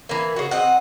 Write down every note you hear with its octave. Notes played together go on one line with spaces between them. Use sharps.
E3 A#3
C#3 F#4
C4 D#5 F#5